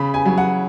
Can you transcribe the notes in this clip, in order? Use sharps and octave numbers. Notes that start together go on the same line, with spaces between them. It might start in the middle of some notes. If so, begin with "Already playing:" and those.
Already playing: C#3 B5
G#5
F#3
F#5